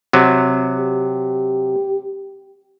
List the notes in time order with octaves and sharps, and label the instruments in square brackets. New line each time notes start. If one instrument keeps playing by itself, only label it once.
[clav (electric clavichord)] C3 F#3
[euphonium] G4